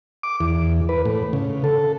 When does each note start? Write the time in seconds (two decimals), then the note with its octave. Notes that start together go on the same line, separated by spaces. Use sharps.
0.23 D6
0.40 E2
0.89 B4
1.05 A2
1.33 C#3
1.64 A4